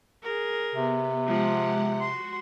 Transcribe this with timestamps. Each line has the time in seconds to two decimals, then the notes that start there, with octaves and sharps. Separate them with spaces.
0.23 G#4 A#4
0.75 C3 B3
1.26 F3 G#3 G4 F#5
2.01 F#4 C6